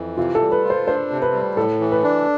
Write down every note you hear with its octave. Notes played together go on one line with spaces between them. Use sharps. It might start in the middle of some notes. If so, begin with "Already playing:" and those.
Already playing: F2 E3
C3 F4
A4
G3
B4
F4
C5
D4 C5
C3
B4
G3
A2 A4
E3
B4
D4